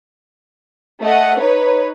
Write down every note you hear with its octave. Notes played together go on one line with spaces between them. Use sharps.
A3 D#5 F#5
D#4 B4 C#5